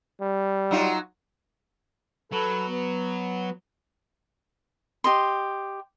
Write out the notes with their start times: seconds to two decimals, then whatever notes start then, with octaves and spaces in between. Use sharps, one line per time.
0.20 G3
0.71 F#3 D#4 F4
2.32 F#3 A4 B4
2.67 B3
5.04 G4 D#5 C6